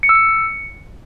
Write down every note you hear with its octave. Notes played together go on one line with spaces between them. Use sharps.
C#7
E6
C#7